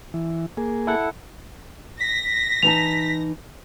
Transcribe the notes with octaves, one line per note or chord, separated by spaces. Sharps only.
E3
A#3 G#4
E4 A4 F#5
A#6 B6
E3 D#4 A5 F7